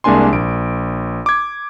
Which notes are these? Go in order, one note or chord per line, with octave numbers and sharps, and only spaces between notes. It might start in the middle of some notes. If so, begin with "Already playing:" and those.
C2 G#3 A#3 D4 G#5 C6
A#1 D7
D6 G#6